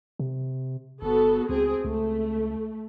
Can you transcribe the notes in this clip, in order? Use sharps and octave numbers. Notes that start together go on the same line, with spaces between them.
C3
G1 B3 F#4 A4
C#2 C4 G#4
C#2 A3